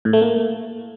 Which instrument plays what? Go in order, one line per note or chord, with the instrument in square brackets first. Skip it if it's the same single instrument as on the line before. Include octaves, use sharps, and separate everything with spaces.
[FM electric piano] A2
A3
A#3